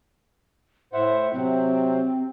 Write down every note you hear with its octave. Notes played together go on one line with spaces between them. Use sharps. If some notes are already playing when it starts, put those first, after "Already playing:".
A2 C5 E5 F#5
C3 F#3 C4